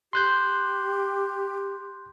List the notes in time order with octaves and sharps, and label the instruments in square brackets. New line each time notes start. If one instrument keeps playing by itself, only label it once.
[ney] G4 [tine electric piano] C6 F#6 G6